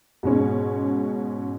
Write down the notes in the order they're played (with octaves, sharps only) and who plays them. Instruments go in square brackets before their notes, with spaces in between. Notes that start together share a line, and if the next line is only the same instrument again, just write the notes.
[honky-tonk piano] G#2 B2 G#3 C#4